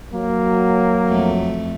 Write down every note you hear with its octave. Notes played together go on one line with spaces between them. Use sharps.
F#3 A#3
F2 A3